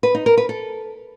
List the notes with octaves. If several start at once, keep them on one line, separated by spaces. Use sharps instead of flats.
B4
D#4
A#4
B4
A4